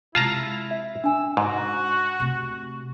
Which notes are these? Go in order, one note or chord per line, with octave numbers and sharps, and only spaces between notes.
C3 G#3 E4 F4 A5 A#5
E5
D4 G#5 E6
G#2 F#4
C3 A3